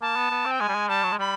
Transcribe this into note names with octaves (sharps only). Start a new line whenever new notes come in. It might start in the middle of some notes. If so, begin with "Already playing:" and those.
A#3 A5
B3
B3
C4
G5
G#3 G#5
G3
G#3
G3 A5
F#3
G#3
G3 B5